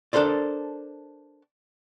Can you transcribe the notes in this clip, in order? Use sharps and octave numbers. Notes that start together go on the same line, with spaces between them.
D4 A4 A#4 C5 D5